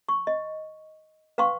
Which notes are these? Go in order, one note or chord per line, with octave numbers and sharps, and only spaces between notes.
C#6
D#5
B4 F5 G5 C6 C#6